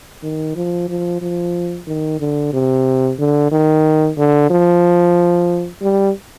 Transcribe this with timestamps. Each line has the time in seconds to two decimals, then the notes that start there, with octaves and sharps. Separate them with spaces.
0.23 D#3
0.56 F3
0.89 F3
1.22 F3
1.87 D#3
2.20 D3
2.53 C3
3.19 D3
3.52 D#3
4.18 D3
4.50 F3
5.82 G3